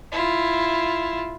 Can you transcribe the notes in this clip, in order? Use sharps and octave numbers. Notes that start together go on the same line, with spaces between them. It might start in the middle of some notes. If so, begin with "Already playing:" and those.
E4 F4